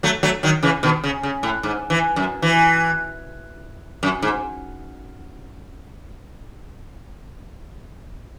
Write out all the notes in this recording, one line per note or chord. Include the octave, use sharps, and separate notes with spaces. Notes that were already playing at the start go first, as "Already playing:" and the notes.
F#3 A3
F#3 A3
D#3 F#3
C#3 E3
B2 D#3
C#3
C#3
A2
G#2
E3
F#2
E3
F#2
G#2